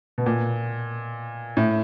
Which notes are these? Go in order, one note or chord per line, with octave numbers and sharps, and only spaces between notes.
B2
A#2
A2